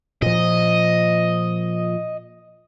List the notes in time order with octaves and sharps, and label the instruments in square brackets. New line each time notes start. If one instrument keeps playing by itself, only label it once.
[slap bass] A#2 F3 [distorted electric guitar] D#5